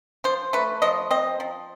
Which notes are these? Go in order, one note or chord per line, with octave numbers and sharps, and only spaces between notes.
F3 C5
A3 B4
F3 D#5
C4 D#5
F3